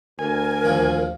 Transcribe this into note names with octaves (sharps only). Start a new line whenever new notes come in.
D2 A#4 G#5
D#2 A#2 F3